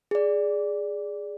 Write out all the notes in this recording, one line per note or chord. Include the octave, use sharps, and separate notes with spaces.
G#4 D5